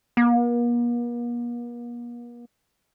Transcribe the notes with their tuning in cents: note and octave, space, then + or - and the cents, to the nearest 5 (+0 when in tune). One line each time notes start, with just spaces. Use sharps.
A#3 +45